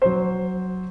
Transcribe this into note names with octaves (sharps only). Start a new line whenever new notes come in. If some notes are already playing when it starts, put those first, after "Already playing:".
F#3 C5